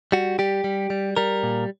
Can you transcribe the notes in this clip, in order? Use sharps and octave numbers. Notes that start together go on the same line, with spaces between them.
G3 F#4
G3 G4
G3
G3
G3 A#4
A#2